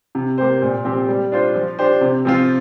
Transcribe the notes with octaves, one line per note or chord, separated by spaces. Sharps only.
C3
A#3 G4 C5
A#2
F3 C4 G4
G3
D4 F4 C5
F3
D4 G4 C5
C3
F3 C4 F4